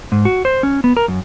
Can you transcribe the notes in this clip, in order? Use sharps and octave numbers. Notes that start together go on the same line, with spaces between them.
G#2
F#4
C5
C#4
B3
A#4
F#2